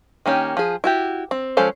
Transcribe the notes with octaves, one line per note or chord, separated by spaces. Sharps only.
D#3 A#3 C#4 G4
F3 G#4
E4 F#4 G4
C4
F3 G#3 C#4 A4 C5